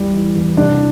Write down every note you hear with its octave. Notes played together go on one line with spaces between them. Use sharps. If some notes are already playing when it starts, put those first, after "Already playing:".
Already playing: E2 E3 G3
E3
E2
C2 D4